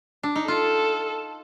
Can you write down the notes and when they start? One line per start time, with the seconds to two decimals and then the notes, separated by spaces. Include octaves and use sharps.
0.23 D4
0.36 D#4
0.48 F4 A4